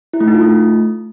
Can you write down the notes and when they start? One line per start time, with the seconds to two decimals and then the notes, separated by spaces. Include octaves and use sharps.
0.13 E4
0.20 A3
0.27 D#4
0.34 F4
0.41 A3